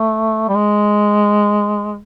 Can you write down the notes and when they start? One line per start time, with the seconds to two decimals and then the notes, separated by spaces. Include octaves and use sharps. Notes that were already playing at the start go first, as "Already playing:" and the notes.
Already playing: A3
0.49 G3
0.56 G#3